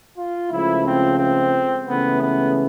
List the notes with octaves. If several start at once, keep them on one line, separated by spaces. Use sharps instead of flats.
F4
C#2 C#3 F3 A3 E4
C4
C4
C#2 C#3 E3 A3 B3
B3